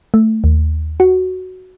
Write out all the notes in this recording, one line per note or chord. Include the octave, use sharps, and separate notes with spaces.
A3
D#2
F#4